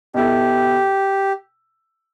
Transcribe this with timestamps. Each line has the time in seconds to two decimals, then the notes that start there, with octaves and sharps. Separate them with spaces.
0.14 B2 B3 E4 G4 A4